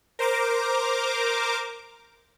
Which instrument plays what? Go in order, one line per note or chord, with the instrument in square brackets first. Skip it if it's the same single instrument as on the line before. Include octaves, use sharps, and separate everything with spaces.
[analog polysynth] A#4 C5 A#5 D6